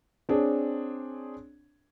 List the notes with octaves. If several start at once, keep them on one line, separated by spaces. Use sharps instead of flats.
C4 D4 G#4 C#5